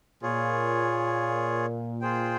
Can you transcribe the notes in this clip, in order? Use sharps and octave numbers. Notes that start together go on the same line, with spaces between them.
A#2 F4 G#4 C#5
F4 G#4 C5 G5